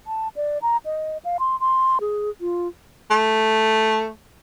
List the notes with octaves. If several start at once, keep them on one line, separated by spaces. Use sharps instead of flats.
A5
D5
A#5
D#5
F5
C6
C6
G#4
F4
A3